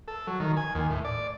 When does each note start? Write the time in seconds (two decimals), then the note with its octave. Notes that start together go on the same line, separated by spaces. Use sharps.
0.08 A4
0.27 F#3
0.40 D#3
0.57 G#5
0.75 D#2
0.90 A2
1.05 D5